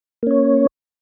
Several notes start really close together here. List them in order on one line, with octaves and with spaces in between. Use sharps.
A#3 C#4 C#5